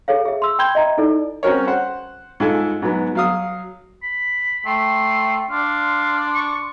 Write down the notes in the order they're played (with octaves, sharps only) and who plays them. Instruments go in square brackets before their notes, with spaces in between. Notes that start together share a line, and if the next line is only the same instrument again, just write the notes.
[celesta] G#4 A4 C#5 F5
G#4 E5
C6 E6
G5 B5 C6 G6 G#6 G7
D#5 E5 A#5
D#4 E4 A4 D5
[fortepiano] C4 C#4 F#4 A#4 C#5
C5 F#5
G#2 F4 A4 G#5
G#2 F#3 B3
F#3 F5 D#6
[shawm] B5
[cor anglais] A3 [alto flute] G5 [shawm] C6
[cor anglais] D4 [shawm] F5 [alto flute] C6
[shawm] C#6